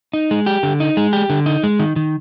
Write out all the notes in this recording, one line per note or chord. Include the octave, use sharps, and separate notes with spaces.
D#4
G#3
G4
D3
D#4
G#3
G4
D3
D#4
G#3
D#3
D#3